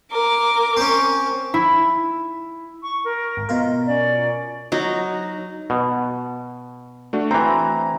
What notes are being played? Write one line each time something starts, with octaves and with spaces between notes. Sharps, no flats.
A#4 D6
C4 C#4
E4
C#6
A#4
G#1
B2 F4 A#4 D#5
C#4 D5
F#3 D#4
B2
A3 D4 F#4
E3 C4 A#5